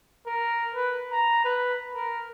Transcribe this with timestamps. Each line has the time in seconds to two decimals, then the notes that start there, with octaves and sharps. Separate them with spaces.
0.26 A#4
0.75 B4
1.12 A#5
1.45 B4
1.95 A#4